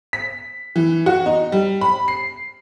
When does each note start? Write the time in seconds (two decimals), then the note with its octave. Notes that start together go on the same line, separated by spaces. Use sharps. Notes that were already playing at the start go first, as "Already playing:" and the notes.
0.13 B6
0.76 E3
1.06 F#4
1.26 D#4
1.52 G3
1.81 B5
2.08 C7